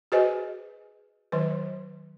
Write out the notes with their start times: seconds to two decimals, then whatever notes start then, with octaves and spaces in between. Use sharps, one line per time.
0.12 F#4 G#4 B4 C5 D#5 G#5
1.32 D#3 F#3 B4